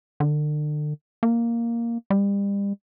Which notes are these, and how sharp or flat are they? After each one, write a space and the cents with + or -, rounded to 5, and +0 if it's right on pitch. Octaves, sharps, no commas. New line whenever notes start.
D3 +35
A#3 +0
G3 +35